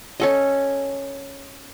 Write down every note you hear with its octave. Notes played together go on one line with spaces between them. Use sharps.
C#4 A4 D#5